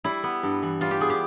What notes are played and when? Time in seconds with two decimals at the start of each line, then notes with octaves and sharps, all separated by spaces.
0.04 G3 E4
0.23 B3
0.43 G2
0.63 E3
0.81 G3 F4
0.91 G4
1.01 B3 G#4
1.10 G4